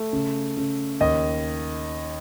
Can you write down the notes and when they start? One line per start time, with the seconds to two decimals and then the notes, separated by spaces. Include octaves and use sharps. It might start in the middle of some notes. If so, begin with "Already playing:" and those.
Already playing: A3
0.13 C#3
0.57 C#3
1.01 D#2 D#5